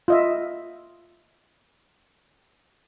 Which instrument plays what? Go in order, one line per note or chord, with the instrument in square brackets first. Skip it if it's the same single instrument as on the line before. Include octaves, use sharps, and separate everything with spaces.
[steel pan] F4 D#5 E5